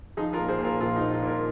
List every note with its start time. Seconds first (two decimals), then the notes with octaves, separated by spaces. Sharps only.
0.17 F3 D#4 G#4
0.33 F4 A#4
0.39 A#2
0.49 G#4 C5
0.59 A#2
0.64 F4 A#4
0.80 A#1 F4 A#4
0.96 D#4
1.01 A#2
1.12 F4
1.22 A#2
1.28 F4 A#4